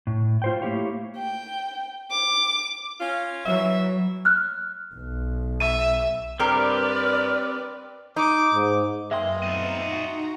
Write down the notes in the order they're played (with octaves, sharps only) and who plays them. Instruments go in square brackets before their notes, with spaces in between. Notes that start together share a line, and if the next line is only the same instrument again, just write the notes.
[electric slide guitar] A2
F4 C5 G5
A3 A#3 E4 G4 C#5 F5
[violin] G5
D6
[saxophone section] C#4 F4
[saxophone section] E3 E5 [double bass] F#3
[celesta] F6 F#6
[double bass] B1
[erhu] E5 [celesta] D#7
[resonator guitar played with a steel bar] G2 A#4 [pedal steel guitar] C4 G4 [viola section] B4 D5 [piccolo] F6
[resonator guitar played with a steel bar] D#4 [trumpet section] D6
[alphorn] G#2
[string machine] F#2 B4 [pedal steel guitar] G#3 A#3 D#5 [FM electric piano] E5 G5 C6
[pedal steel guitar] A3 B3 C4 [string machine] D#4 A#5 [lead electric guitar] F4 D#5
[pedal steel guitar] F#4